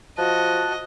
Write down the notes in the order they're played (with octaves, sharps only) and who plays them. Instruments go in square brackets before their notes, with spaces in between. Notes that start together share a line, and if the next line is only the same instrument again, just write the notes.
[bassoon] F3 [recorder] F#4 [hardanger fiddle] D#5 [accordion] A5 F#6